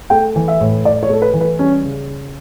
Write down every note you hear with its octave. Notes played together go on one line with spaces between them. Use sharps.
A3 G5
E3
E5
A2
A2 D5
C#5
A3 A4
B4
E3
B4
G3 C#4
C#3